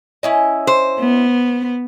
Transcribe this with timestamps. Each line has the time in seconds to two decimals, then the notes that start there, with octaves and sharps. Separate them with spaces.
0.23 C#4 E4 D#5
0.67 C5
0.99 B3